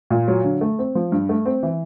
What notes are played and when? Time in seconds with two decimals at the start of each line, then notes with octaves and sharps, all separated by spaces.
0.10 A#2
0.28 F#3
0.44 D3
0.61 A3
0.79 C4
0.95 F3
1.12 G2
1.29 A3
1.46 C4
1.63 E3